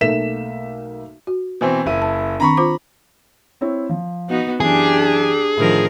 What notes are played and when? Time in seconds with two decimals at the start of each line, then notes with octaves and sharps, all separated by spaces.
0.01 B1 A3 A#3 E5 B6 E7
1.27 F#4
1.61 B2 E3 C4 B4 C5
1.86 F#1 E4 D#7
2.02 A5
2.40 D#3 C4 D4 A#5 B5 C#6
2.57 F4 C5 D6
3.61 C4 E4 C#5
3.89 F3
4.29 B3 D#4 F#4
4.60 F#2 E3 D4 G4 G#4
5.57 A2 D3 D#3 F3 A#4